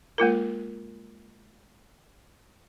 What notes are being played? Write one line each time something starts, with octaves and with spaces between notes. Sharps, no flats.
G#3 A#3 F4 A#4